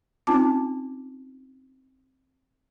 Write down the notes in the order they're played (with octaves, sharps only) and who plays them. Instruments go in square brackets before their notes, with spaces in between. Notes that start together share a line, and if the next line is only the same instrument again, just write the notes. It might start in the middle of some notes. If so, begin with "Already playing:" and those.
[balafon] C4 C#4 D#4 F4 A5 D6